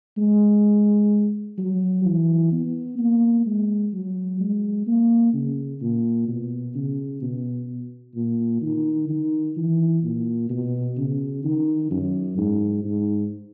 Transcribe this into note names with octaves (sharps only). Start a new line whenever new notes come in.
G#3
F#3
E3
B3
A#3
G#3
F#3
G#3
A#3
C#3
A#2
B2
C#3
B2
A#2
D#3
D#3
E3
A#2
B2
C#3
D#3
F#2
G#2
G#2